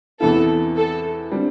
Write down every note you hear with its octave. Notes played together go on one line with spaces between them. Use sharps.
E2 C3 E3 B3 E4 A4
A4
D3 G3 C4